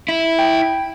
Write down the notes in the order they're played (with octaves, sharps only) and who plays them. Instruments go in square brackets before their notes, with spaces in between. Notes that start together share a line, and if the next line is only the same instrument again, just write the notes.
[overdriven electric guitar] E4
[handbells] G5